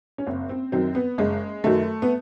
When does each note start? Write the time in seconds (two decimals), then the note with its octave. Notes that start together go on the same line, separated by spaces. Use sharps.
0.18 C#4
0.27 F#1 C4
0.49 C4
0.72 F#2 D#3 F#3 C4
0.95 B3
1.18 F#1 G#3
1.64 F#2 D#3 F#3 A3
2.02 B3